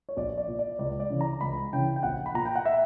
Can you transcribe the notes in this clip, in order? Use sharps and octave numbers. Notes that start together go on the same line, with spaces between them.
C#5
A#1 D5
D5
A#2
D5
C#2 D5
D5
C#3 E3
A#5
C#2 B5
C#3 E3 G5
G5
A#1 F#5
B5
A#2 A#5
G5
F#5
E5